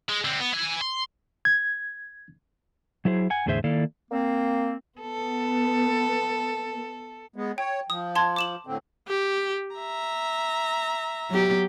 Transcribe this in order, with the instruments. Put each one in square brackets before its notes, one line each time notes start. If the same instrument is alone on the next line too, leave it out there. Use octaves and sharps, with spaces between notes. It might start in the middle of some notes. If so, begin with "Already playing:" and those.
[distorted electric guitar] G#3
D3 C4
B3
E4 G#5
C6
[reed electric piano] G#6
[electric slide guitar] F#3 E4 G#4 C5
F#5 G#5
E2 A2 D3 G#4 C5 E5
D#3 A#3 E4 A4 D5 F5
[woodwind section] A#3 C4
[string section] B3 [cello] A4
[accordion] G#3 B3
[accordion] C#5 [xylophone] G5
[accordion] F3 [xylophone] D#6
[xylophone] A5 C6 G#6
D6 E7 F#7
[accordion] A2 D3 C4
[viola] G4
E5 A#5
[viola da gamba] F#3 B3 G4